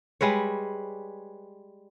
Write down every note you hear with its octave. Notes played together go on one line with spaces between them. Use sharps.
G3 G#3 B4 C#5